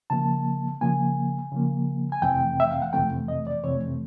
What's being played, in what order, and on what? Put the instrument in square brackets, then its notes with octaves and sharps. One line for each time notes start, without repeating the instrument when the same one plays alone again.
[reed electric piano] C#3 F3 A#3 A5
C#3 F3 A#3 G#5
C#3 F3 A#3
G#5
F2 C3 E3 A3 C4 G5
E5
F5
F#5
F2 C3 E3 A3 C4 G5
D#5
D5
F2 C3 E3 A3 C4 C#5